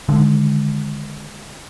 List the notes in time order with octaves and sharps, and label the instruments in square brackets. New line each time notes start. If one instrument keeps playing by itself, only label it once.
[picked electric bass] D3 D#3 G#3